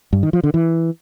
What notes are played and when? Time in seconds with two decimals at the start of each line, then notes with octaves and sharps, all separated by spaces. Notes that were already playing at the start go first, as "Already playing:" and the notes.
0.13 G2
0.23 D#3
0.33 F3
0.44 D3
0.54 E3